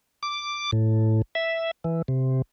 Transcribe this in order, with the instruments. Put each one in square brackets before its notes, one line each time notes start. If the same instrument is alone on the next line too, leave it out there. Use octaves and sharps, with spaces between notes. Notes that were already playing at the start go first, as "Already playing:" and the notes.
[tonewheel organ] D6
A2
E5
E3
C3